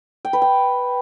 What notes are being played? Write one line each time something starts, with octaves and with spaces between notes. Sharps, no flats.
G5
B4
G5